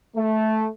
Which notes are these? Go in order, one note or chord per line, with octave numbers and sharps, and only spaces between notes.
A3